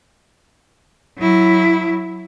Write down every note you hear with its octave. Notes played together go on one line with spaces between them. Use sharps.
F#3 E4